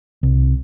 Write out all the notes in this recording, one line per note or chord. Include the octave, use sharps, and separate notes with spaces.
C2